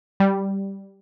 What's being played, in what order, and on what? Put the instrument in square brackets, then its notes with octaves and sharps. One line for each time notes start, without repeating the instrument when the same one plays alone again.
[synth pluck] G3